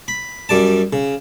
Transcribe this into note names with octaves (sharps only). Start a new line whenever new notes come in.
B5
F#2 G3 D5 A5
C#3